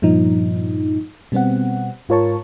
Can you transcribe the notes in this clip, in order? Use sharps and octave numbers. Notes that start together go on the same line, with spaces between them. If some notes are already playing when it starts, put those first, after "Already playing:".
G2 A#2 F3 D#4
B2 G3 B3 C4 F#5
G#2 F4 A#4 C#5 A5 C#6